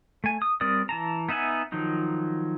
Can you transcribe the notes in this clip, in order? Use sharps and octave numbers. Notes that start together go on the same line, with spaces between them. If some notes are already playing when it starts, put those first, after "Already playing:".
A3 G#5
D#6
G3 C4 A#4 D5 D#6
E3 A5 A#5
B3 D#4 E5 F#5 G#5
D#3 F3 F#3 D#4